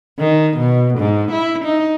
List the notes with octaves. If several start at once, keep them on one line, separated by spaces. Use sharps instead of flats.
D#3
B2
G#2
E4
D#4